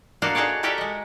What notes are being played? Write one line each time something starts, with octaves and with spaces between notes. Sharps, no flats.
A#3 D4 F#4 A4 D#5 F5
D#4 F#4 G#4 A4 C#5 D5
F#4 G4 A4 A#4 D5 E5
G#3 D#5